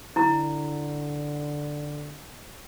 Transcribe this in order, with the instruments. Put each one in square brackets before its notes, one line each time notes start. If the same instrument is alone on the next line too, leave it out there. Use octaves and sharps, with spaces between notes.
[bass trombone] D3 [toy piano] E4 A#5